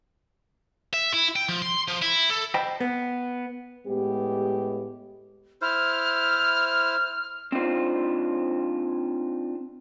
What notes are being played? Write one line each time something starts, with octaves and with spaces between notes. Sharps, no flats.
E5
E4
G5
F3
C6
F3
E4
A4
C5 D#5 G5 A5 B5
B3
A2 G#3 B3 G4
E4 C5 F6
C4 D4 D#4 F4 C5